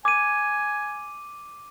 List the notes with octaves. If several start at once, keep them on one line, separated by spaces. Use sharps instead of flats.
G#5 D6 D#7